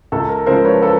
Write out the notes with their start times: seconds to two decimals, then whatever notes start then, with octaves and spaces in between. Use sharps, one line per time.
0.12 C#2 A4
0.29 A#4
0.46 C#3 F3 G#3 A#4 C5
0.64 B4 C#5
0.82 A4 B4